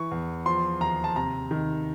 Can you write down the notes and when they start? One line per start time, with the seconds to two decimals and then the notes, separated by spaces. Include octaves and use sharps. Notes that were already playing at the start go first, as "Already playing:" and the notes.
Already playing: E3 C#6
0.11 E2
0.46 F3 C6
0.80 D#2 A#5
1.04 A5
1.16 C3 A#5
1.51 D#3